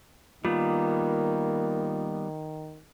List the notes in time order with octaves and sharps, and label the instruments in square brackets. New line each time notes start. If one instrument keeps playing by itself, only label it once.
[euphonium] D#3 [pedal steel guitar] G3 B3 [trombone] A#3 [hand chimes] F4